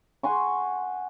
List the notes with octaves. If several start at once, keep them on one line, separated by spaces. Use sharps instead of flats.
F#5 G#5 C6 C#6